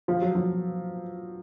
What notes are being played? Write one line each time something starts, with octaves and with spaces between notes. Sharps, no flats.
F3
F#3
F3